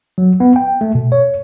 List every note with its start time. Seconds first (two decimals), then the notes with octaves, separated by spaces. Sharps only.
0.18 F#3
0.40 B3
0.56 G5
0.81 A3
0.95 B2
1.12 C#5